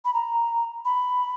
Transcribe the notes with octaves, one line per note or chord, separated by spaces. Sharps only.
B5
A#5
B5